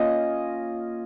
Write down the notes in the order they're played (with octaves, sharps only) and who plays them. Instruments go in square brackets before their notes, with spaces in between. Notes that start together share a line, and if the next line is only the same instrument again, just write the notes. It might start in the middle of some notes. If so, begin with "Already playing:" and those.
Already playing: [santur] A#3 C#4 F4 D#5